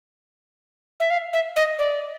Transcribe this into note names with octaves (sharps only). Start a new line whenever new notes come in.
E5
F5
E5
D#5
D5